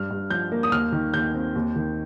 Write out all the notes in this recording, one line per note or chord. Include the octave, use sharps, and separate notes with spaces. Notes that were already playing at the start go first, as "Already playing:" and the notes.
Already playing: G2 F6
G2
F3 G6
A#3
D#6
D#2 F6
D#3
D#2 G6
C4
D#2
D#3